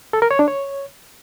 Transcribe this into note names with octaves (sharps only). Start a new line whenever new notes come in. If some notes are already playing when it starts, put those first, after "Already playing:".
A4
A#4
C#5
D4
C#5